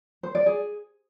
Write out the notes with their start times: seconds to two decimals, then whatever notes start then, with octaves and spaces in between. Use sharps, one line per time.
0.23 C5
0.35 D5
0.46 G#4